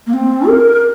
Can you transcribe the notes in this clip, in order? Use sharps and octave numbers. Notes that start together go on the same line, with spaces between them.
A#3
C4
A#4